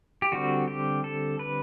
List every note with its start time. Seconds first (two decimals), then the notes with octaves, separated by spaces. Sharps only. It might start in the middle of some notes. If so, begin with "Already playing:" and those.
0.22 G4
0.32 D3 G3 C4 F#4
0.68 G4
1.04 A4
1.39 B4